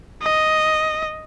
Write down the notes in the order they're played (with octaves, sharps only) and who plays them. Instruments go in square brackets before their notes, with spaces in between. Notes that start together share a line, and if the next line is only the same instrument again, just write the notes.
[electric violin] D#5